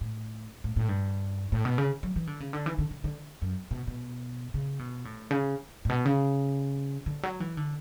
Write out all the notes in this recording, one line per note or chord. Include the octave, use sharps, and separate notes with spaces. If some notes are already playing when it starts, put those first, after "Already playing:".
A2
A2
A2
G2
A2
B2
C#3
F#3
E3
D3
C#3
D3
E3
D3
D3
D3
F#2
B2
B2
C#3
B2
A2
C#3
A2
B2
C#3
D3
F#3
E3
D3